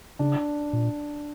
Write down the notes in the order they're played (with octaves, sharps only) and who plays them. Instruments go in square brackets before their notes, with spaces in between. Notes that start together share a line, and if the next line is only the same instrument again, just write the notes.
[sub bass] C#3 [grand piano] D4
[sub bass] A#2